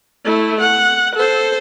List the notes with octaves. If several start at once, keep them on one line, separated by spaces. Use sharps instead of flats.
A3 E4
F#5
A4 C5